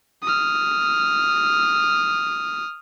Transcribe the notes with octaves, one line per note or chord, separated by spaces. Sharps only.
D#6 F6